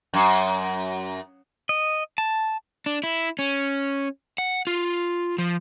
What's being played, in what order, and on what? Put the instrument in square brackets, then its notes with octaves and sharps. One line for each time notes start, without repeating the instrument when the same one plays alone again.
[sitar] F#2
[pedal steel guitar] D#5
A5
[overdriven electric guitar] D4
E4
C#4
F#5
F4
F3